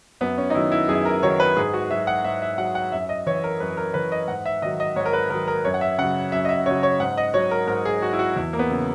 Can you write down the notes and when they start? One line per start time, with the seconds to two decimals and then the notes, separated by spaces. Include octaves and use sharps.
0.21 F#2 B3
0.38 C#4
0.50 D#4
0.55 D#3 F#3 E4
0.72 E4
0.88 F#2 G#4
1.05 A#4
1.23 D#3 F#3 C#5
1.40 B4
1.56 G#2 G#4
1.73 F#4
1.91 F#3 E5
2.07 F#5
2.24 G#2 E5
2.42 E5
2.58 F#3 F#5
2.75 F#5
2.92 F#2 E5
3.09 D#5
3.26 E3 C#5
3.44 A#4
3.60 F#2 B4
3.77 A#4
3.94 E3 B4
4.12 D#5
4.28 G#2 F#5
4.46 E5
4.62 D#3 F#3 D#5
4.80 D#5
4.96 G#2 C#5
5.06 A#4
5.13 B4
5.30 D#3 F#3 A#4
5.47 A#4
5.65 F#2 C#5
5.74 F#5
5.81 E5
5.98 C#3 F#3 F#5
6.32 F#2 E5
6.45 D#5
6.49 E5
6.66 C#3 F#3 C#5
6.83 C#5
7.00 G#2 F#5
7.17 D#5
7.34 F#3 C#5
7.51 A#4
7.67 G#2 A#4
7.85 G#4
8.02 F#3 F#4
8.13 E4
8.19 F#4
8.36 E2 E4
8.53 A#3
8.59 B3
8.70 C#3 F#3